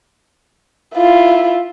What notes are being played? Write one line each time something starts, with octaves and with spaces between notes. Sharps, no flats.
E4 F4